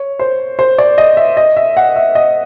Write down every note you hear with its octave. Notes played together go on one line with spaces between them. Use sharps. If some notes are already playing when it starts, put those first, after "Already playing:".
Already playing: C#5
C5
C5
D5
D#5
E5
D#5
E5
F#5
E5
D#5